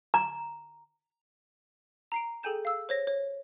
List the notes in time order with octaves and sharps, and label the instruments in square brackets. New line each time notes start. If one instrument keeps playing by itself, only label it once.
[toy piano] A#5
[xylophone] A#5 C7 D7
G#4 A4 G5 G#5 G6 E7
F5 E6
C5 C#5 A#6
C#5